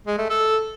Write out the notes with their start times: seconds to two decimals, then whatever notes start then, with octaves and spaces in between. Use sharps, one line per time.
0.07 G#3
0.18 A3
0.29 A4